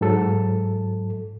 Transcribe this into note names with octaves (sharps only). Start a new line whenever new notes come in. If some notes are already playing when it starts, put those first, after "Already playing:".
G#2 F#3 A4